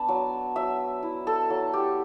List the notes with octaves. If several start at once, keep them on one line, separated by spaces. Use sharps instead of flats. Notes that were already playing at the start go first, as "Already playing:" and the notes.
Already playing: B3 D4 A5 B5
F#3
F#3 E5
E4
A4
F#3
G4